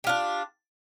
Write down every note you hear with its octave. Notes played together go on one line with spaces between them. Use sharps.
D4 F4 G4